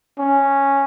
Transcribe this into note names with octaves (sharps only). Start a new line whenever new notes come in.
C#4